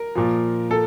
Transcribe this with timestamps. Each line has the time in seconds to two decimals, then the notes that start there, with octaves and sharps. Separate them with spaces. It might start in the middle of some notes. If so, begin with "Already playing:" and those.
Already playing: A#4
0.15 A#2 F3
0.71 A4